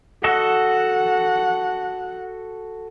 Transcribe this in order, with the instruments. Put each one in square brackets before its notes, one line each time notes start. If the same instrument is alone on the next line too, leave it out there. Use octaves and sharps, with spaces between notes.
[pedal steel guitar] F#4 A4 D#5 [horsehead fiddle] F#5